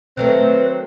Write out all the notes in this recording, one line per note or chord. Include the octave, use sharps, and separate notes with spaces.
D#3 F#3 A3 C4 B4